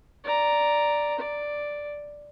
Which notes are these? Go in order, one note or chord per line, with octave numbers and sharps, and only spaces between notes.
D5 A#5
D5